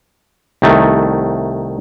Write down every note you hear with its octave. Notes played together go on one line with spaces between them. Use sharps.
C2 D#3 A3